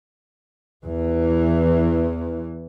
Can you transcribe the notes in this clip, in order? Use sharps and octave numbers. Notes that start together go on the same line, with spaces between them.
E2 E3